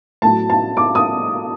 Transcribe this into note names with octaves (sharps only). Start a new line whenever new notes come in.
A2 F#3 A5
A5
D6
D#6